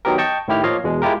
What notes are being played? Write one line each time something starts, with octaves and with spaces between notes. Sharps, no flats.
D#3 F#3 B3 G4 A#4
D#5 G5 A5 C#6
A2 D#3 E4 G4 F6
F3 A#3 F4 C#5 D#5 F5
E2 B2 G#3
G#3 E4 F4 G4 A#4